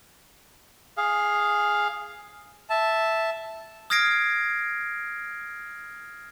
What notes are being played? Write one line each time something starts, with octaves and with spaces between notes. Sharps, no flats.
G#4 F5
E5 A5
D#6 F6 G#6 A#6 C7 D7